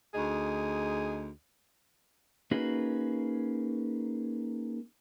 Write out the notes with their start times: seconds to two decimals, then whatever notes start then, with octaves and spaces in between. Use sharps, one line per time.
0.14 D2 D#4 G#4
2.51 A#3 C#4 D#4 F#4 G#4 B4